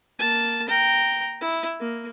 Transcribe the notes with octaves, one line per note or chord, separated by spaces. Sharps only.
A#3 A5
G5 A#5
E4
A#3